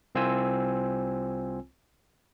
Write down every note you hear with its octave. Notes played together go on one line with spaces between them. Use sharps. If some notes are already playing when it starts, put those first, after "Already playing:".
C2 C4 F4 C5 G#5 E6